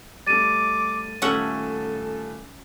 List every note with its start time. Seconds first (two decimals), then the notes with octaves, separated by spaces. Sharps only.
0.26 G3 A3 D6 A6 D#7
1.22 D#1 A3 C#4 A4 E5 F#5 G5